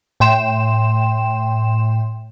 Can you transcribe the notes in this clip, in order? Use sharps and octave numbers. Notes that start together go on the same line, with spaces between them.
A2 G5 C6 E7